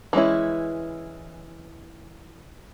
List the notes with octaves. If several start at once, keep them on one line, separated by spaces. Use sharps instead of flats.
E3 G#3 C#4 E4